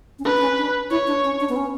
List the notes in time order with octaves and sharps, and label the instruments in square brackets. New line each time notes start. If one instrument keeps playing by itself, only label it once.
[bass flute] C#4
[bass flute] D4 [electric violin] B4
[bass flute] D4
C#4
D4
[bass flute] E4 [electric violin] C#5
[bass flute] D4
C#4
D4
B3
C#4